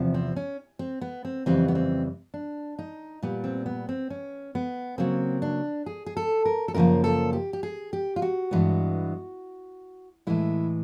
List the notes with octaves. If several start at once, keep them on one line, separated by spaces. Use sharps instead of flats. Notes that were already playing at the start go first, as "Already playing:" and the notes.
Already playing: E2 C3 F3
C4
C#4
C4
B3
C4
F2 C#3 E3 G3 C4
B3
C4
D4
D#4
A#2 G3 B3
C4
B3
C4
C#4
B3
C#3 F#3 A#3 C4
D4
G#4
G#4
A4
A#4
A4
F#2 C#3 F3 A#3 A#4
A4
G4
G4
G#4
G4
F4
F#4
G2 E3 G#3 B3
A2 E3 G#3 E4